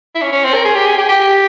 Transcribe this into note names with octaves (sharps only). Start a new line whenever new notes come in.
E4
C#4
C#4
C4
A#4
G#4
G4
G#4
G4
G4